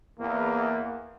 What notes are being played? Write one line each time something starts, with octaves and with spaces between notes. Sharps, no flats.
E2 A#3